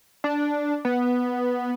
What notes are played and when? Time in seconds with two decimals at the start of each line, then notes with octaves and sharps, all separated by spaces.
0.24 D4
0.85 B3